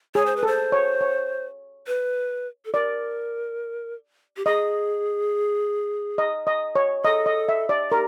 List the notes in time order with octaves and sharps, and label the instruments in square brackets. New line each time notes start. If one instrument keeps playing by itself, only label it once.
[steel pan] G#4 [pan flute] C#5
[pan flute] C5
B4
[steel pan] A4
[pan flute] C5
[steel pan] C#5
C#5
[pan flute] B4
A4
[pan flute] A#4 [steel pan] D5
[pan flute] G4
[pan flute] G#4 [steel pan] D#5
[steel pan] D#5
D#5
C#5
[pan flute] A4 [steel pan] D#5
[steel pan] D#5
E5
D5
[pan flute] G4 [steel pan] A#4